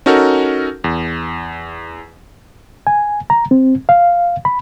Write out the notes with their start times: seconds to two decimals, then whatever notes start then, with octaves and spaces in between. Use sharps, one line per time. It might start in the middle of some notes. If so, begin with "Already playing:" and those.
0.06 C#4 D#4 F#4 A4 A#4
0.84 E2
2.87 G#5
3.30 A#5
3.51 C4
3.89 F5
4.45 B5